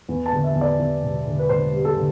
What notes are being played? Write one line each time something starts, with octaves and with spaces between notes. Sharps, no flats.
E2
A5
D3
E5
E2
D5
E2
E1
D3
B4
D3 C5
G3
A4
D3